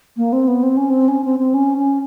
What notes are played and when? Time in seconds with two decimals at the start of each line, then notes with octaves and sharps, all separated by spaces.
0.17 A#3
0.33 C4
0.48 B3
0.63 C4
0.77 C#4
0.90 C4
1.08 C#4
1.24 C4
1.39 C4
1.54 C#4
1.78 C#4